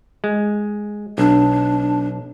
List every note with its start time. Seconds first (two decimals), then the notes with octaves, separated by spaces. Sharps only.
0.24 G#3
1.18 B1 D4